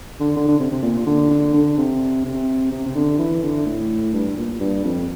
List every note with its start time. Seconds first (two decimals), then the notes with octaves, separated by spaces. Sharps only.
0.20 D3
0.36 D3
0.48 D3
0.59 C3
0.71 C3
0.83 A#2
1.07 D3
1.30 D3
1.54 D3
1.77 C3
2.25 C3
2.71 C3
2.86 C3
2.95 D3
3.19 E3
3.43 D3
3.66 A2
4.13 G2
4.37 A#2
4.60 G2
4.85 F2